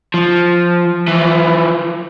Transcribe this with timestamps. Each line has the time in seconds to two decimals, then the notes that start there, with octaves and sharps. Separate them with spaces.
0.14 F3
1.08 E3 F3